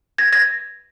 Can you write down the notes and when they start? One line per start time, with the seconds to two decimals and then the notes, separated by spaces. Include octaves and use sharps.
0.18 G#6 A#6
0.32 G#6 A#6